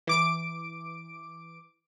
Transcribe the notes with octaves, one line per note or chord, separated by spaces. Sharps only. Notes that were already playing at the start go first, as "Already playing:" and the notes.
E3 D6 D7